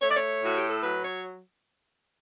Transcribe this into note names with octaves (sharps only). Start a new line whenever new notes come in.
A3 C#5
D5
C#5
A2 F#4
G4
A4
F#3 B4
C#5